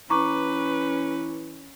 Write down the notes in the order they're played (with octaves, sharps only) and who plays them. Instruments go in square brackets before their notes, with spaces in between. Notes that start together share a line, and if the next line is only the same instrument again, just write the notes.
[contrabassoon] E3 [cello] C#4 [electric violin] B4 [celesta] A#5 C#6 D6